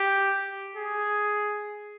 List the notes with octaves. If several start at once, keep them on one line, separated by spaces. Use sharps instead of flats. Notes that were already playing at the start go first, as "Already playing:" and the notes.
Already playing: G4
G#4